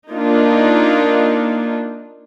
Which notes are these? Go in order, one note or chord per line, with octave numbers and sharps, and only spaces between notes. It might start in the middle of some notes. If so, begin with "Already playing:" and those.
A#3 D4 D#4 F4